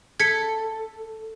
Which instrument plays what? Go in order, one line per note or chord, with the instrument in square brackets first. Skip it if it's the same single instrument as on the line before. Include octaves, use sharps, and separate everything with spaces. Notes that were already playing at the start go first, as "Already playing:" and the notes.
[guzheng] A4 [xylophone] G#6 B6 C#7